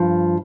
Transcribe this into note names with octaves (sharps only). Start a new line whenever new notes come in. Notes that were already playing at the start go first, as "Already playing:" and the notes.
Already playing: G2 F3